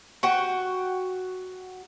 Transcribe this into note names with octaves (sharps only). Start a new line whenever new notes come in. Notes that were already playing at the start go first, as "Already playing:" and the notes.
F#4 F#5 G5